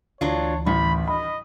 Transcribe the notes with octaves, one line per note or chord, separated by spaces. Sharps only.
D2 E3 F#3 D4 F4 C#5
A1 D#3 B5
D#5 B5